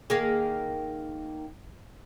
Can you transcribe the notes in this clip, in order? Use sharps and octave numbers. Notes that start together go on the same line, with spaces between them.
D#3 A#3 G#4